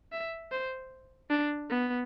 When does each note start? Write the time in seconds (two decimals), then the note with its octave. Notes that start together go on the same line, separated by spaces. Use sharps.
0.12 E5
0.52 C5
1.30 D4
1.70 B3